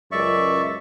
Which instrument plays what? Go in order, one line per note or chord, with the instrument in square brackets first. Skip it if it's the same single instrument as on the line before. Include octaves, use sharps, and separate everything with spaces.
[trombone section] C#2 F#2 G#3 [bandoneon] D5 E5 C#6